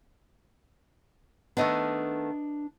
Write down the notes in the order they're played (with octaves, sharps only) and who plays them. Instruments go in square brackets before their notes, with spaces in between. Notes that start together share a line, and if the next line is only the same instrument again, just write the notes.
[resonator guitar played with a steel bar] D#3 A3 B3 [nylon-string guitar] D4 B4 D#5